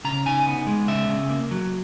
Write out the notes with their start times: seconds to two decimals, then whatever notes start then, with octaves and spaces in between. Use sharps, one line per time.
0.05 C#3 A#5
0.26 D#4 G#5
0.47 B3
0.67 G#3
0.88 C#3 E5
1.09 C#3
1.30 A#3
1.51 F#3